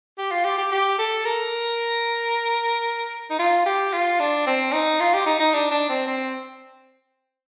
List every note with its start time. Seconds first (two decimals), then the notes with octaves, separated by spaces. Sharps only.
0.18 G4
0.31 F4
0.45 G4
0.58 G4
0.72 G4
0.98 A4
1.25 A#4
3.30 D#4
3.39 F4
3.66 G4
3.93 F4
4.20 D4
4.47 C4
4.73 D#4
5.00 F4
5.14 G4
5.26 D#4
5.40 D#4
5.54 D4
5.71 D4
5.89 C4
6.07 C4